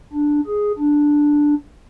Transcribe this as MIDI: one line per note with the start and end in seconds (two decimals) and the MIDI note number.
0.13 0.41 62
0.47 0.72 68
0.79 1.55 62